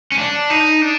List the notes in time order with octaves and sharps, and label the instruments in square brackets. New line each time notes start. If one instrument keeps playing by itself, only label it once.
[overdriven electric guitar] C#4
D4
D#4
D4